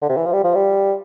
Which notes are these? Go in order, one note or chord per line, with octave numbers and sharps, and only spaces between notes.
D3
C3
E3
F3
G3
F3
G3